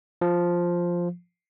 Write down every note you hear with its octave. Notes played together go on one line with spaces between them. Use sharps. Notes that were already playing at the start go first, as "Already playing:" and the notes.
F3